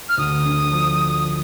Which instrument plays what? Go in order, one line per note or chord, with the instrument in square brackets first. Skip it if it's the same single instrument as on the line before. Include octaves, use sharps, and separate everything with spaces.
[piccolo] F6
[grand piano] D2 [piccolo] D#6
[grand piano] D3
F3